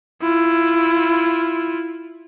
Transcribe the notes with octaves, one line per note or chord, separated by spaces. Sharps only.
E4 F4